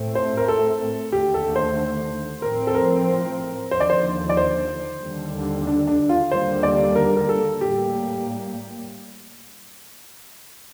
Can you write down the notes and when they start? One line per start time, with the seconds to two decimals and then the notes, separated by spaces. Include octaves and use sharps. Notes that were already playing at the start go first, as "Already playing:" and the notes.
Already playing: A2 A3 C4
0.15 C5
0.37 A#4
0.48 A4
1.12 D#2 D3 A3 G4
1.34 A4
1.56 C5
2.42 A2 F3 C4 A#4
2.67 A4
2.75 A#4
3.71 D#2 D3 F3 C5
3.80 D5
3.90 C5
4.29 D5
4.37 C5
5.02 D#2 D3 G3
5.67 D4
5.87 D4
6.09 F4
6.31 D#2 D3 G3 A#3 C5
6.63 D5
6.95 A#4
7.17 A#4
7.29 A4
7.61 A2 G3 A#3 G4